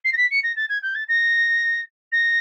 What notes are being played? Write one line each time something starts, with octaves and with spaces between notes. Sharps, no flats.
C7
A#6
B6
C#7
A#6
A6
G#6
G6
A6
A#6
A#6